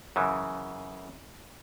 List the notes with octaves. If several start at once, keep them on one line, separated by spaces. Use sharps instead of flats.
F#2 C#3 E3